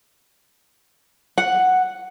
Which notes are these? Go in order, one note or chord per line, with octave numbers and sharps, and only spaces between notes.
F#5